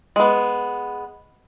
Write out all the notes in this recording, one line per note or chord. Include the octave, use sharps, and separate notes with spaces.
G#3 B3